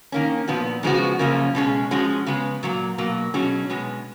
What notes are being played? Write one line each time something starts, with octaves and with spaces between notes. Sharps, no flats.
D#3 A#3 C#4
A#2 F3 B3 F#4
C#3 F3 G#3 B3 F#4
F#2 C#3 F3 A#3 C#4
B2 G#3 C#4 G#4
F3 G#3 C#4 F#4
C#3 G#3 B3
A#2 F#3 A#3
B2 F#3 A#3
B2 F#3 C#4 G#4
B2 G#3 B3